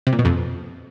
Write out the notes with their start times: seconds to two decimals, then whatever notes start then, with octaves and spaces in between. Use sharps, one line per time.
0.07 C3
0.13 A#2
0.19 B2
0.25 F2